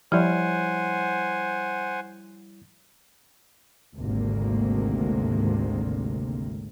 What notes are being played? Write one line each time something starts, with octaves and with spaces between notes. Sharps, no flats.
F3 G3 E4 C5 C#5 F#5 G#5
G#1 D2 C3 A#3